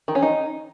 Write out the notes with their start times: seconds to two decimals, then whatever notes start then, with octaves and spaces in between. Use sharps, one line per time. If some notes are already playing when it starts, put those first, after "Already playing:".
0.08 D#3
0.15 C#4
0.22 D#4